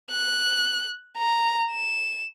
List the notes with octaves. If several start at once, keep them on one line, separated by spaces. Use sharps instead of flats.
F#6
A#5
E7